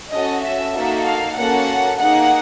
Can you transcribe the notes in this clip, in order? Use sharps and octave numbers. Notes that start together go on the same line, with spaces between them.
C#4 F#4 A4 D#5
E5
A#3 D#4 F#4 A4
F5
A#3 C#4 F#4 A4 F#5
A#3 D#4 G#4 F#5